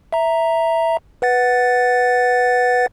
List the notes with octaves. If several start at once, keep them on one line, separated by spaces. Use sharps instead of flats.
E5 A#5
B4 F#5 A6